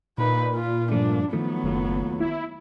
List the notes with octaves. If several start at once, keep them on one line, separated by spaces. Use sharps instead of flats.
A#2 D#4 B4
F4
G2 F3 A3 D4
D#3 F3 F#3 A3 B3
F#1 D#2 A3 F4
E4